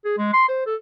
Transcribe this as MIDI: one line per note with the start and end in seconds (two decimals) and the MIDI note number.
0.05 0.13 68
0.18 0.30 56
0.33 0.45 84
0.48 0.64 72
0.66 0.75 69